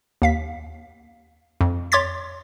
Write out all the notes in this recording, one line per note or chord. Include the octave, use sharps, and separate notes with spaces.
D#2 F5 B6
F2
C#5 C6 D6 G#6 A6 B6